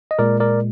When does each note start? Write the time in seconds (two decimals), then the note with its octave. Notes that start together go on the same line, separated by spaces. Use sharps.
0.11 D#5
0.19 A#2 G#3 A#4 D5
0.40 A#4 D5